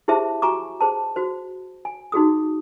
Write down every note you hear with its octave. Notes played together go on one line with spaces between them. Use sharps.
E4 G4 G#4 C5 E5 A5
F#4 G#5 A#5 C#6 D6
G#4 C5 A5
F#4 C5
G#5
D#4 F#4 G#4 D#6